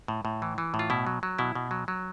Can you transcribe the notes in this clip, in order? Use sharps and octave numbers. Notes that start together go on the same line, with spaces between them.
A2
A2
E3
E3
A2
F4
B2 E4
F#3
F#3
B2 E4
B2
F#3
F#3